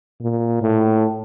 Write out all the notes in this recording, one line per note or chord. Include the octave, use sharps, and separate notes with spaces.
A#2
A2